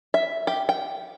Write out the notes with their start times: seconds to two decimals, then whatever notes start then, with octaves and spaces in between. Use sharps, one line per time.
0.14 E5
0.47 G4
0.69 G5